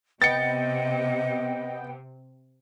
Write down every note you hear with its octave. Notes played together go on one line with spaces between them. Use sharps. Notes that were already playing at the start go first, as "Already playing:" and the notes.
C3 B3 D#5 G5 A6 C#7